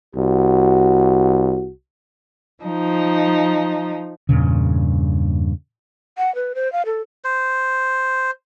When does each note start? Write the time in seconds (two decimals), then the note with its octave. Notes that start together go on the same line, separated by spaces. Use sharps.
0.16 C2 F#4
2.64 F3 D#4
4.29 E2 G2 A#2 C#3
6.18 F#5
6.35 B4
6.55 C5
6.73 F5
6.86 A4
7.24 C5